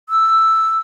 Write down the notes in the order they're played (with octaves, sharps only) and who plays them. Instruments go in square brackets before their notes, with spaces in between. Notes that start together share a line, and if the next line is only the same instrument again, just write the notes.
[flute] E6